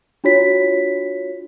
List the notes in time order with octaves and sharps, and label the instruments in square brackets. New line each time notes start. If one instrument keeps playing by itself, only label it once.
[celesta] D4 F4 F#4 C#5 B6